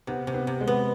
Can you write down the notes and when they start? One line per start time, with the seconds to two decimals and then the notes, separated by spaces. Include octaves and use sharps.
0.07 C3 B3
0.27 C3
0.34 B3
0.47 C3
0.60 G#3
0.67 B3